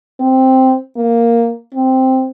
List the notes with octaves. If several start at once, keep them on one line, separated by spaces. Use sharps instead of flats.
C4
A#3
C4